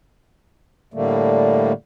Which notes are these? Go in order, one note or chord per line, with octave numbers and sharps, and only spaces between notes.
A2 D3 G3 A3 A#3